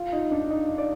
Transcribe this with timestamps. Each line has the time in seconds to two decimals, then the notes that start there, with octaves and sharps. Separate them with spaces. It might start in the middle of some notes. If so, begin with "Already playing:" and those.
Already playing: F4
0.12 D#4
0.31 D4
0.50 D#4
0.78 D5